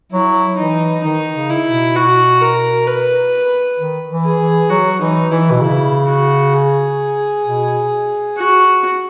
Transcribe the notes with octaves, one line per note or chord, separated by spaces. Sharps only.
F#3 E4
E3 D#4
D#3 D#4
C#3
E4
B2
F#4
A#4
B4
D#3
E3
G#4
E3
F#3 F#4
E3 D#4
E3 E4
B2
C#3 E4
F#4
G#4
B2
F#4